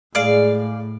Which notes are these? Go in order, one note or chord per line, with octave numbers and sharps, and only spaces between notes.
A2 G#3 G#4 D5 F5